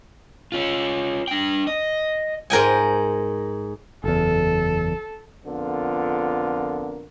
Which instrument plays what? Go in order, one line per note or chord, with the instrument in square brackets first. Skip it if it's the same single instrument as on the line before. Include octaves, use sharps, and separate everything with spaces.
[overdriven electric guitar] C#4 F4
D4 G5
D#5
[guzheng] G#2 A#4 G5 G#5
[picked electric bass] F#1 E2 [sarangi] A4
[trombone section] F2 D3 B3 F4 A#4